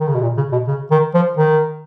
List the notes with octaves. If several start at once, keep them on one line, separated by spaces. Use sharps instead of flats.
D#3
C#3
B2
A#2
C#3
B2
C#3
D#3
F3
D#3